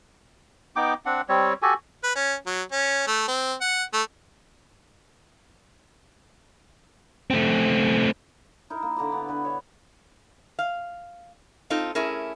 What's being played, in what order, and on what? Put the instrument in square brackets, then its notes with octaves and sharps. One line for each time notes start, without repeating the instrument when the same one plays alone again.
[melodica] B3 D#4 G5 D6
C4 D4 F#5
G3 C4 C#5
F#4 G4 A4 G#5
[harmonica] B4
C#4
F#3
C#4
A3
C4
F#5
A3
[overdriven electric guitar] A3 C4
[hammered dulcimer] D#4 E4 A#4
A#3
D3 A#5 B5 D6
B3
D3 B4
C#5 E5
[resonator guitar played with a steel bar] F5
C4 D#4 F4 A4
A3 C#4 E4 G#4 A#4